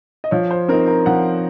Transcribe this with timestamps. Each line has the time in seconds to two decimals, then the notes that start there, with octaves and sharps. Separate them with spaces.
0.24 D#5
0.31 F3 C#5
0.51 C5
0.68 C4 D#4 A#4
0.88 A#4
1.06 F3 F#5